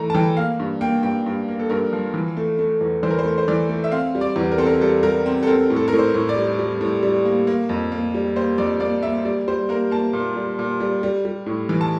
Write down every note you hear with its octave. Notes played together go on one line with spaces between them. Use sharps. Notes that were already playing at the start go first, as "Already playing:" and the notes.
Already playing: E3 A3 A#5
A5
E3 G5
A#3 F5
G2
A#3 G5
G2 G5
G2
A#3
A4
G2 A#4
F3
E3
A3
A3
E2
E3 C5
A#4
C5
A3
C5
E3 D5
A3
E5
C4 F5
G3
D5
E2
A#4
C4 A4
A#4
G3 A4
G3 A#4
C4
A4
C4 A#4
A2
A4
A2 A#4
C5
A2
D5
G3
G3
A2
G3
A#3
A#3
F2
A#3
G3
A#3 C5
F2 D5
A#3 D5
A#3 E5
G3 D5
G3 C5
A#3 A#4
A#3 A5
A#2
G3
A#2
G3
G3
G3
A2
E3
A5